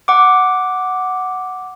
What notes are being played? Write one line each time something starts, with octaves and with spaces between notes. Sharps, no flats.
F#5 D6